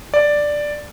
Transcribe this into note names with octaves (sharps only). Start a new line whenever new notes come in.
D5